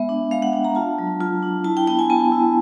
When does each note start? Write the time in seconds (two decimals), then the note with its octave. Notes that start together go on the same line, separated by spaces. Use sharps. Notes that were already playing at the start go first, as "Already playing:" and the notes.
Already playing: G#3 B3 E5
0.09 D4
0.31 G#3 F5
0.42 F#5
0.53 D4 G5
0.65 A#5
0.75 F4 A5
0.98 F#3
1.21 F4
1.43 D4
1.64 E4 A5
1.77 G5
1.87 B3 G5
1.99 G#5
2.10 B3 A5
2.32 E4